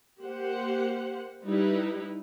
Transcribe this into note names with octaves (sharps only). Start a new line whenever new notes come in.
A#3 G4 C5 F#5
G3 D#4 E4 B4